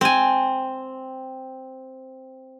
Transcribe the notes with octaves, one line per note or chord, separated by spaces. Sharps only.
C4 G#5